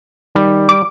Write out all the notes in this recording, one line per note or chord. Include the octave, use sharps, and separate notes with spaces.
D#3 G3
D6